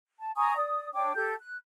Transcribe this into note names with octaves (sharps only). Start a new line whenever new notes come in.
A5
G#5 A#5 C#6 D#6
D5 D#6
D4 C#5 G5 D6
G4 A4 G6
F#6